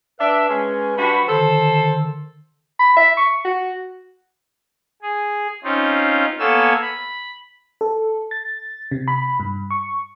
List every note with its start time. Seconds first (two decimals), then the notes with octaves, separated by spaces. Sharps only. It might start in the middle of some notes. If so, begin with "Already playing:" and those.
0.19 D4 B4 E5
0.49 G#3 C#4
0.97 G2 F#4 B5
1.28 D3 D#3 A4 C5
2.79 B5
2.97 E5
3.17 C#6
3.45 F#4
5.02 G#4
5.64 C4 C#4 D#4 F4
6.39 A#3 B3 A4 C#5 G#5 E6
6.82 B5
7.81 A4
8.31 A6
8.91 C3
9.08 B5
9.40 G2
9.70 C#6